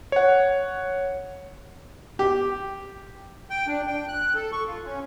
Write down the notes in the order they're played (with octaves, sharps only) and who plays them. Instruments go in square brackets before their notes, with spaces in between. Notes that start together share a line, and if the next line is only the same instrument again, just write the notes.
[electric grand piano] C#5 F#5
[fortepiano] G4
[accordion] G5
D4
G5
F#6
A4
C#6
F4
C#4